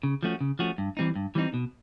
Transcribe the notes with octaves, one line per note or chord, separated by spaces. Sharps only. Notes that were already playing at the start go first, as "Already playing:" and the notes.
C#3
F3 A3 C#4 F#4
C#3
F3 A3 C#4 F#4
G2
E3 G3 C4 D#4
G2
E3 G3 C4 D#4
B2